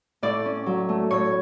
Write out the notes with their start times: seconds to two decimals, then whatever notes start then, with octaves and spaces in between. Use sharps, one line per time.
0.22 A2 D5
0.45 C#4
0.66 F#3
0.89 A3
1.11 A2 C#5